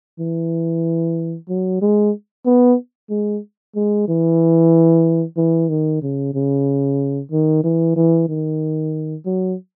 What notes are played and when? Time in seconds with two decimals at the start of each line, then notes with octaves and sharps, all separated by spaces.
0.20 E3
1.49 F#3
1.82 G#3
2.46 B3
3.10 G#3
3.76 G#3
4.08 E3
5.37 E3
5.69 D#3
6.02 C#3
6.34 C#3
7.31 D#3
7.64 E3
7.96 E3
8.29 D#3
9.26 F#3